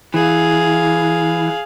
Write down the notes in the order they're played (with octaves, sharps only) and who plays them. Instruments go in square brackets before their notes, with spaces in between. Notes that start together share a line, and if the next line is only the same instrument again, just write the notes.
[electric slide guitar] E3 [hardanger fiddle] G#4 F5